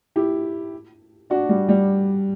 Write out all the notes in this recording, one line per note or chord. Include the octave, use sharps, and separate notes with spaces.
E4 G4
D4 F#4
G3
G3